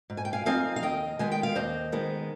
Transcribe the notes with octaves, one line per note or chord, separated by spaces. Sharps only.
G#2
G#5
G5
F5 G#5
F3 C4 D#4 F5 G#5
F5
D#2 D#5 G5
D#3 G#3 B3 G#5
G5
F5
D#2 C5 D#5
D#3 G#3 B3